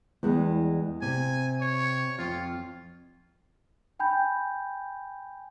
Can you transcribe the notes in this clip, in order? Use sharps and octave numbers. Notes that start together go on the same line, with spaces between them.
E2 G3 G#3
C3 G#5
C#5
F2 F4
G5 G#5 B5 G6